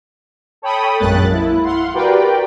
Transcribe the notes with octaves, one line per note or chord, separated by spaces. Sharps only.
A4 C#5 G5 B5 D#6
A#1 F#2 G#3 A#3 F#6 A6
E4
F5 F#5 C6
F#4 G4 A#4 B4 D5 G5